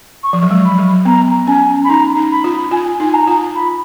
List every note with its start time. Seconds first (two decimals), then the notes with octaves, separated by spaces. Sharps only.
0.23 C#6
0.33 F3
0.42 F#3
0.51 G#3
0.64 B5
0.78 F#3
1.05 B3 A#5
1.47 C#4 G#5
1.84 B5
1.89 D#4 A#5
2.16 D#4
2.31 B5
2.44 F4
2.71 F4 G#5
3.00 D#4
3.06 G#5
3.13 A#5
3.27 F4
3.54 B5